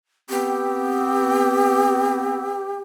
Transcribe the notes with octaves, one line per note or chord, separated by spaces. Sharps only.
B3 C4 G4